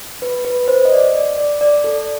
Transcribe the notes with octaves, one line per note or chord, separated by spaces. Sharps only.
B4
B4
C5
D#5
D5
D5
D5
D5
A4